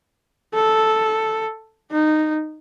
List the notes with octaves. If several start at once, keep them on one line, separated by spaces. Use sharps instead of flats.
A4
D#4